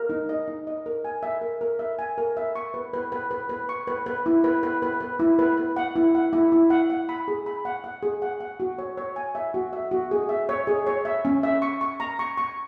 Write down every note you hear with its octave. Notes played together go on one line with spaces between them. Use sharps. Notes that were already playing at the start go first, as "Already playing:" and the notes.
Already playing: A#4
D#4
D#5
D#4
D#5
A#4
G#5
E5
A#4
A#4
E5
G#5
A#4
E5
C#6
B4
B4
B4
B4
B4
C#6
B4
B4
E4
B4
B4
B4
B4
E4
B4
B4
F#5
E4
F#5
E4
E4
F#5
F#5
B5
G#4
B5
F#5
F#5
G#4
F#5
F#5
F#4
C#5
C#5
G#5
E5
F#4
E5
F#4
G#4
E5
C#5
G#4
C#5
E5
C#4
E5
C#6
C#6
A#5
C#6
C#6